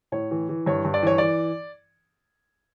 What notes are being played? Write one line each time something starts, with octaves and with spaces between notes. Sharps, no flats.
A2 C#5
E3
E3
G2 C#5
G2
D5
E3 C#5
E3 D5